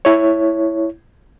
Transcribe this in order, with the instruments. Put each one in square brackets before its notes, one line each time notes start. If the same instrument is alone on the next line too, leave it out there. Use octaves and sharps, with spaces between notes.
[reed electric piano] E4 C#5